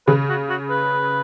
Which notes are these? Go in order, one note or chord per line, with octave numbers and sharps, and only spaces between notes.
C#3 B4
F#4
F#4
B4